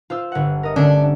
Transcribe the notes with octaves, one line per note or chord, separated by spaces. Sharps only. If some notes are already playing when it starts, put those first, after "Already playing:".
F4 C5 E6
G1 F#5
A#4 D#5
D3 A3 C#4 D4